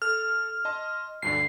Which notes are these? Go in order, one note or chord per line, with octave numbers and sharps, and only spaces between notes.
A4 F6
D#5 A5 C6
D2 G2 D3 C7